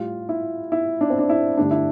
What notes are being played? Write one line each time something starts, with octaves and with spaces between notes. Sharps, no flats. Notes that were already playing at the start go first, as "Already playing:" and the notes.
Already playing: A2 G3 F4
E4
E4
D4
C4
D4
E4
G2 D3 A3 D4
E4